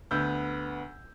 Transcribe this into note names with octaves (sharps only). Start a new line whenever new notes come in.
D2 B3 E6 G6